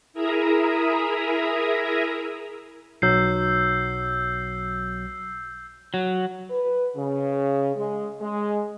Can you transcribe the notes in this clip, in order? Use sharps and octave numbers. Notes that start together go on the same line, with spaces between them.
E4 G#4 A#4 E5 A#5 D#6
B1 F#3 E6 G6 C7
F#3
B4
C#3
G#3
G#3